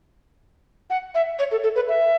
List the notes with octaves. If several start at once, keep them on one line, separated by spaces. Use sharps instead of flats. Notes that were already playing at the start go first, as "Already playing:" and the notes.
F#5
E5
C#5
A4
A4
B4
E5